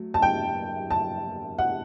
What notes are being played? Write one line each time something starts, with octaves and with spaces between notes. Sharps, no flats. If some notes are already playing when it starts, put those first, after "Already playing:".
Already playing: F#3 A3
A5
G5
A5
F#5